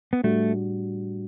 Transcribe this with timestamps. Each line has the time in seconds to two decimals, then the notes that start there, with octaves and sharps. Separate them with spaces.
0.13 B3
0.24 A2 G3 A3 D4 F#4